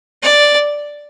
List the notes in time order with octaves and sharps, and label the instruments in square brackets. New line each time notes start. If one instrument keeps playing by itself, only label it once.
[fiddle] D5